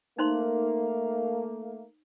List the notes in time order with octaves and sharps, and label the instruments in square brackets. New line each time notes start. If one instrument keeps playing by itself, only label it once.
[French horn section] A3 A#3 [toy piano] D#4 C5 C6